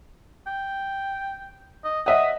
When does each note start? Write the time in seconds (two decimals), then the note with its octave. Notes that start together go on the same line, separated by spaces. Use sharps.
0.47 G5
1.84 D#5
2.06 D#5 E5 F#5 D#6